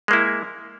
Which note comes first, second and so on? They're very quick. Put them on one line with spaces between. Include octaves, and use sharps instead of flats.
G#3 A#3 E4